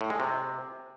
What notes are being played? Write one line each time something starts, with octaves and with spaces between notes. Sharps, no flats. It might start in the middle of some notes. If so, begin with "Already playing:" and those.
A2
G#3
C3